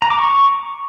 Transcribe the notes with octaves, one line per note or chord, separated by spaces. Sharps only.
A#5
D6
C#6